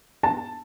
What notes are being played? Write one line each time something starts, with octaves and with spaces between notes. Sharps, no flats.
A5